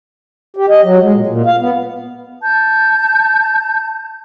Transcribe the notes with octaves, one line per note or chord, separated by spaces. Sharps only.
G4
D#5
F#3
G#3
A#2
A#2
F5
B3
A5 G6